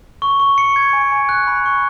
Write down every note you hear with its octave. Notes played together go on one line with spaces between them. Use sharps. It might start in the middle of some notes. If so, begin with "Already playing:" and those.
C#6
C#6
C#7
G#6
G#5
G#5
F#6
B5
C#6